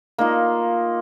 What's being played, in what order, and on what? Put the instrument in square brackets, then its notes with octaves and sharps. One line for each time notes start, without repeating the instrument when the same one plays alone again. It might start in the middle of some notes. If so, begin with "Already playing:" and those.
[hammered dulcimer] A#3 D#4 F4